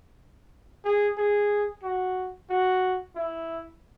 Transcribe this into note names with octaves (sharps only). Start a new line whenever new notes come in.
G#4
G#4
F#4
F#4
E4